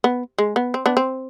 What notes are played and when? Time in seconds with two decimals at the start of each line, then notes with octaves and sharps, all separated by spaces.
0.04 B3
0.38 G#3
0.56 B3
0.74 C4
0.86 B3 D4
0.97 C4